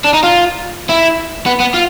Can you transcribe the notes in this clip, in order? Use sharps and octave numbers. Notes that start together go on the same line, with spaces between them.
D4
D#4
F4
E4
B3
B3
F4